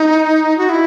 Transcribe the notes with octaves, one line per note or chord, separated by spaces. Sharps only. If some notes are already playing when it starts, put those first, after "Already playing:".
Already playing: D#4
F#4
E4